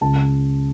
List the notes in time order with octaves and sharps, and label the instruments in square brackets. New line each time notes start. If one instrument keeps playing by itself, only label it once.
[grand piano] C#2 A5